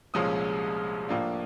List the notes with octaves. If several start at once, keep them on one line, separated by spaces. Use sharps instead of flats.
C2 A#2 F3 G#3 C#4 D#6
A2 F3 A#3 D4 F4